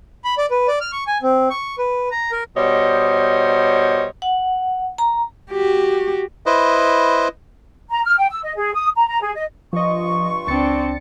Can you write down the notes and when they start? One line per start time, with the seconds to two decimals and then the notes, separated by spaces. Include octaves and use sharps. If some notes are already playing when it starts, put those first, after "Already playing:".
0.24 B5
0.38 D5
0.51 B4
0.68 D5
0.81 F6
0.92 C#6
1.07 G#5
1.23 C4
1.50 C#6
1.78 B4
2.11 A#5
2.32 A#4
2.56 B2 G3 C5 C#5 D#5
4.22 F#5
4.98 A#5
5.51 F#4 G4
6.46 E4 B4 C5 D#5
7.89 A#5
8.05 F6
8.18 G5
8.30 E6
8.43 D#5
8.56 G#4
8.73 D#6
8.95 A#5
9.07 A#5
9.21 G#4
9.35 D#5
9.73 G2 F3 F4 D#5 C#6
10.47 C#2 C4 D4 A6 C#7